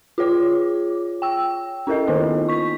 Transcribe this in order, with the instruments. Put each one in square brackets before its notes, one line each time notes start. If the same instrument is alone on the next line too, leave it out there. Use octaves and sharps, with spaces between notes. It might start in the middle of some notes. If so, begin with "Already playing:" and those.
[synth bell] F4 G#4 C#5 D6
G5 E6
C#4 E4 A4 A#4 D#5
D#3 A#3 B3 D#4 F4
C#6 B6